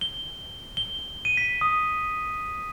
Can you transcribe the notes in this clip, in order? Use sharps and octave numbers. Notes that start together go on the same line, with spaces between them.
G7
G7
D#7
B6
D#6